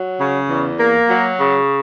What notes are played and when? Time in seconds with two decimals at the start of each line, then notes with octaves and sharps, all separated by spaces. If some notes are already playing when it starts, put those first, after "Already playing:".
Already playing: F#3
0.18 C#3
0.48 E2
0.78 A#3
1.09 F#3
1.39 C#3